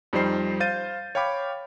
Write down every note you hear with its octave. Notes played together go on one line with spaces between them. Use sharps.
F2 G3 C4 D#4 C5 C7
C5 F5 G6 A6 D#7
C#5 F5 G5 B5 D6